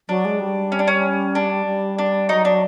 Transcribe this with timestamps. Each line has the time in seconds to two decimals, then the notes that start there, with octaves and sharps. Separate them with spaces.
0.09 F#3 D4
0.25 G#3
0.40 G3
0.72 C#4
0.79 D4
0.88 C#4
1.35 D4
1.66 G3
1.98 D4
2.29 F#3 D#4
2.45 D4